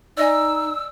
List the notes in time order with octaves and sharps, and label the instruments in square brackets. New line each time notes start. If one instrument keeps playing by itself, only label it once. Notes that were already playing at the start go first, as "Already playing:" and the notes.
[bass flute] D#4 [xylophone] D5 D#5 G#5 [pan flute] E6